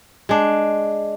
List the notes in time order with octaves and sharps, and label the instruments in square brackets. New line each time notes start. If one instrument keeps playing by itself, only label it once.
[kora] G#3 D4